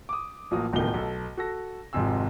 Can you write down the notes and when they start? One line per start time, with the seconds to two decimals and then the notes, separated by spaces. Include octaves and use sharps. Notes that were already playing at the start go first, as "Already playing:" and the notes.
0.09 D6 D#6
0.51 A1 F3 F#3 A#3 F#4 D#6
0.73 D1 C#2 B2 D3 D#3 G7
0.94 B1 A4
1.37 F#4 A4 A#6
1.93 G#1 F2 G#2 C3 G#5 E6